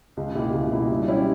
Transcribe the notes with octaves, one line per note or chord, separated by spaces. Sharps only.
C#2
B2 A#3 E4 G4
C#2
B2 A#3 E4 G4
G2
F#3 C#4 E4 G4